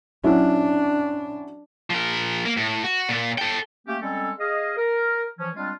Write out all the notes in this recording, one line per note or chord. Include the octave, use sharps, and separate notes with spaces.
F#3 C#4 D4 E4
F3 A#4
A#3
A2
F#4
A#2 A#3
A4 G5
A3 A#3 C#4 G4
G3 G#3 C4 C#4 A4
G#4 D#5 F5
A#4
E3 F3 C#4
G3 G#3 C4 D4 F4